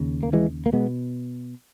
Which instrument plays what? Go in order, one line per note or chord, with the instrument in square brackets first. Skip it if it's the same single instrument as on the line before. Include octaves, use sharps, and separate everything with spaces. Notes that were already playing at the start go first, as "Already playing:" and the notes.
Already playing: [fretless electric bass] D#2 C#3
A#3
E3 G#3
A#3
B2 G#3 B3